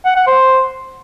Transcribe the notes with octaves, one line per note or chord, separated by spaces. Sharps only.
F#5
F#5
C5